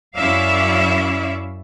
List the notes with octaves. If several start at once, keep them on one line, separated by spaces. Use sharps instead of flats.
F#2 C#4 E4 D5 E5 F5